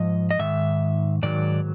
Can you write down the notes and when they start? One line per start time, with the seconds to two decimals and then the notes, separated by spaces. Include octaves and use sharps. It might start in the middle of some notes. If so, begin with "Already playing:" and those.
Already playing: G#2 F3 D#5
0.31 D#5
0.39 G#2 D#3 E5
1.23 G#2 D#3 F#3 D5